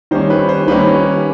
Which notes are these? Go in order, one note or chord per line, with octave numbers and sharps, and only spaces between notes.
D#3 G3 A#3 C#4 C5
B4
C5
D#3 G3 A#3 C#4 B4